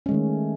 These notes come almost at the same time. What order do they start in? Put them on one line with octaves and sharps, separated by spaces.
C#4 G#3 D#3 A3